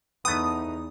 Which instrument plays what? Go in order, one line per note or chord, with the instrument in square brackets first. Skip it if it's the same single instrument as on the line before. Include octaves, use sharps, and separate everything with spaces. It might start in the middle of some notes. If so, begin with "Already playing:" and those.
[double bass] E2 D#4 [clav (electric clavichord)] A3 B3 [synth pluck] D#6